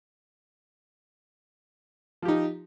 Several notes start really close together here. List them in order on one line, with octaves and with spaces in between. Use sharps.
F3 G4 D#4